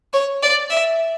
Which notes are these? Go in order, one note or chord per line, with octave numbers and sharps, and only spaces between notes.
C#5
D5
E5